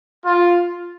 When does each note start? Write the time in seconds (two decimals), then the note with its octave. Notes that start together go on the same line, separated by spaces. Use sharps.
0.24 F4